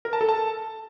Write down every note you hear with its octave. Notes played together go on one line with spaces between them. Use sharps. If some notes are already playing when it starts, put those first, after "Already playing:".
A#4
A5
A4
A5